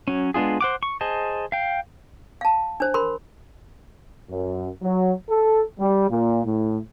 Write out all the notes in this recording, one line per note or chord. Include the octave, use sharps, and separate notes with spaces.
F#3 C#4
G#3 B3 D4 F4 G#4
C5 F#5 D6
C#6
G#4 C5 D#5 A5
F5 G5
F5 A5
D4 C5
A#4 B5 C6
F#2
F#3
A4
G3
A#2
A2